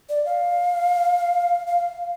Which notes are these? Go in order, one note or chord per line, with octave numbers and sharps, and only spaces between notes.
D5
F5
F5